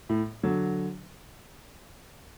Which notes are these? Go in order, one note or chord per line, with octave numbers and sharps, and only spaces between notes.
A2
D3 F#3